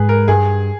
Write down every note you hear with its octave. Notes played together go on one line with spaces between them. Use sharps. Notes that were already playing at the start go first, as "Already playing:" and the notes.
Already playing: G#2 G#4 B4
A#4
G2 G#4